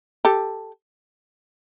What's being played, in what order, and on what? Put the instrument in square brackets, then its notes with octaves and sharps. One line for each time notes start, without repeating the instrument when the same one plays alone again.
[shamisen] G4 A4